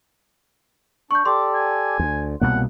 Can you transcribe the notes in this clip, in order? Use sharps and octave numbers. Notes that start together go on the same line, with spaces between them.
D4 C#6 G6
G4 A4 D5 C6 D6
G#5
D2
C2 B2 F#3 A#3 F#5